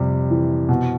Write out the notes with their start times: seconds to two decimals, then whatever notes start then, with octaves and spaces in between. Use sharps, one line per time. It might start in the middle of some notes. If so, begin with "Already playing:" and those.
Already playing: F2 C3 G3
0.30 E3
0.69 B2